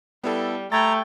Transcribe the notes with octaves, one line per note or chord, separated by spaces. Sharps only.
G3 B3 E4 A4
A3 G5 A#5 B5 G#6 A6